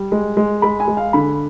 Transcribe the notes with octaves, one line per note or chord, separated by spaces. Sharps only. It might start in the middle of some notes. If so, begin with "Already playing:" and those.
Already playing: G3
G#3
G#3
G#3 B5
G#5
G#3
F5
D3 B5